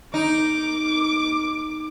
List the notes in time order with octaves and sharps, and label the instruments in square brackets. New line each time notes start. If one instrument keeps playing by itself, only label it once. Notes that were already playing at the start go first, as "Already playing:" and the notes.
[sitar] D#4 [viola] D6